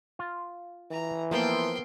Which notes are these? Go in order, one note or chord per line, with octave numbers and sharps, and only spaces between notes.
F4
E3 A#5
F3 A#3 B3 A4 C5 G5 C6